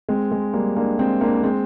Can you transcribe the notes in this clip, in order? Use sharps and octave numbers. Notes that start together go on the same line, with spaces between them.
G#3 C4
G#3
G3 A#3
A#3 D4
G#3 C4
A#3 D4
G#3 C4